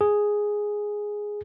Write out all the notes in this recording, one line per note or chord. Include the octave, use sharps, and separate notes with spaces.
G#4